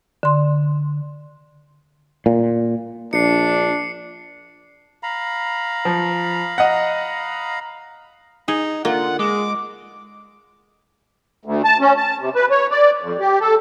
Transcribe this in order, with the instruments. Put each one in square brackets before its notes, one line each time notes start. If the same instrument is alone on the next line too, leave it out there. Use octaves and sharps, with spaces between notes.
[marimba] D3 C6
[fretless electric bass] A#2
[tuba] A#1 [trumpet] D4 [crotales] C7 C#7
[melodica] F5 A#5 B5
[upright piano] F3
D#5 F#5
[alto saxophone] D#4 [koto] G#4
[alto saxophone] D3 [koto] A#3 [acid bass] F4 [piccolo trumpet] F#5
[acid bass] G#3 [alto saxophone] G#4 [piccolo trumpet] D6
[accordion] D2
A5
C#4
A5
C3
B4
C#5
D5
F2
G4
A4